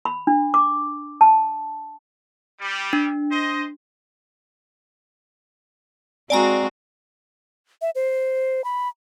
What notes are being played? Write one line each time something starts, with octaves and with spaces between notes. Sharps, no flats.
B5
D4
D6
A5
G3
D4
C5 D#5
G#3 C4 F#4 D5 G#5 A#5
E5
C5
B5